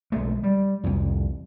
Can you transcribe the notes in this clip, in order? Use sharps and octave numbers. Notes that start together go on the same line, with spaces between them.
B1 G#3 A3
G3
C2 F2